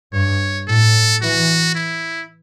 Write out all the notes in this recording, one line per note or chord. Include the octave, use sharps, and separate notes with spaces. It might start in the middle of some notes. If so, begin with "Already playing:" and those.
G2 C#5
A2 A4
E3 F#4
E4